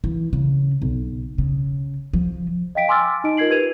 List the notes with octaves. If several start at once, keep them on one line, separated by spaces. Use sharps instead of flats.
E3
C#3
B1
C#3
F3
D#5 F5 G5 B6 D7
G#5 C6 D6 E6 F6 A6
D#4 D#5 D7
F4 A#4 D#5 G#6 C7 F#7
G4 B4 G#6 D#7 F7